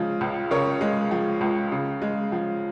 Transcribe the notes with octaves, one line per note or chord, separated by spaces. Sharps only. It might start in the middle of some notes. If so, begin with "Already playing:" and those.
Already playing: C#3 F3 G#3
C#2
C#3 A#4 C#5
G#3
F3
C#2
C#3
G#3
F3